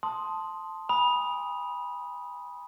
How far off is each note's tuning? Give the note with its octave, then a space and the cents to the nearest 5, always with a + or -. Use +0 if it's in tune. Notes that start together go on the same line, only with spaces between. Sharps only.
A5 +0 C6 +0 D#6 +0
G#5 -35 B5 -20 D#6 +0